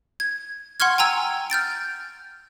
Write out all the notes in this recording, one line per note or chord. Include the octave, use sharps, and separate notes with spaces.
G#6
F#5 C6 C#6 F6 G#6
G5 G#5 A#5 E6 G#6
F6 G6 A6 D7